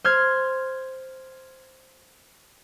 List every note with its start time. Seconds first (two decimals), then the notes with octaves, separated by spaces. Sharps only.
0.04 C5 F6 G#6